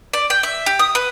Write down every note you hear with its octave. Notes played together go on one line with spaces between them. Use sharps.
D5
G5
E5
G4
D#6
B4